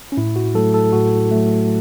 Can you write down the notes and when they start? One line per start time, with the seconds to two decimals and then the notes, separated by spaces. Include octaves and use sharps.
0.12 C#4
0.17 A2 E4
0.36 F#4
0.55 F#3 A3 A4
0.74 A4
0.93 A2 F#4
1.31 F#3 A3